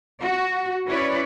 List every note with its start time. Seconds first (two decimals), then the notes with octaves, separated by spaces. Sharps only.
0.22 F#4
0.88 C#4 E4 B4 C#5 D5